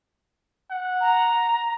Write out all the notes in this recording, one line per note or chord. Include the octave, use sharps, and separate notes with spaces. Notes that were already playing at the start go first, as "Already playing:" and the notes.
F#5
A#5